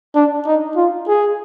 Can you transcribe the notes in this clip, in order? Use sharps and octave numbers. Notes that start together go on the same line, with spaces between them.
D4
D#4
F4
G#4